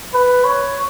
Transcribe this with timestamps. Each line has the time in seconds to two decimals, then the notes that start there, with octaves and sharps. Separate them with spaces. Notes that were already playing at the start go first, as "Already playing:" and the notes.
0.14 B4
0.45 C#5